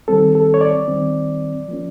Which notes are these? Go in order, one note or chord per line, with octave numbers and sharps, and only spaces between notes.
D#3 G3 C4 A4
A4
C#5
D5
D#3 G3 C4
F3 A#3 C#4